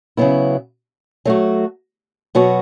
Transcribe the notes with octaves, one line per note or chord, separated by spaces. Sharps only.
C#3 F#3 B3 E4
F#3 A3 F#4
B2 F#3 B3 F#4